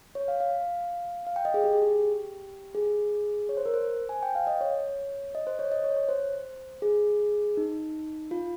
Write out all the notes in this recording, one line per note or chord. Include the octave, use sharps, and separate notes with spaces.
C#5
F5
F5
F5
G5
D#5
G#4
G4
G#4
G4
G#4
C#5
C5
A#4
C5
G#5
G5
F5
D#5
C#5
D#5
C5
C#5
D#5
C#5
C#5
C5
G#4
D#4
F4